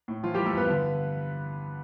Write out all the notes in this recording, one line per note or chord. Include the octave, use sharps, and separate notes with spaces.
A2
E3 F3 F4
E3 G3 G4
A3 A4
G2 B3 B4
D3